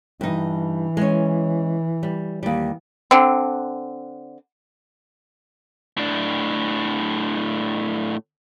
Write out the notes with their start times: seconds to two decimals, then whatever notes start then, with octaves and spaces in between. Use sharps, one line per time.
0.21 G2 E3 D#4
0.97 G#3 C#4
2.03 G3
2.43 D#2 G3
3.11 D3 C4
5.97 A2 D4